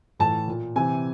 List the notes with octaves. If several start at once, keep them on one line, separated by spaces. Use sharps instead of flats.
A2 E3 A5
A#2
C3 E3 G#5